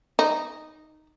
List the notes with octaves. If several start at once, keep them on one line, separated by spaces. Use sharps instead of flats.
D#4